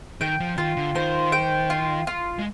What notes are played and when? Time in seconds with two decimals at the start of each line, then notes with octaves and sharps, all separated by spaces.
0.21 D#3 G5
0.40 F3
0.58 D#3 F4
0.77 D3
0.95 D#3 C5
1.32 G5
1.70 F4
2.07 F4
2.39 G#3